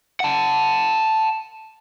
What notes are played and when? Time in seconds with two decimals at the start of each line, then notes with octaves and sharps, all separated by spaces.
0.20 F#5 A5